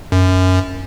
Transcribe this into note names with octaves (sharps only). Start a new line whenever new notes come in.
F#2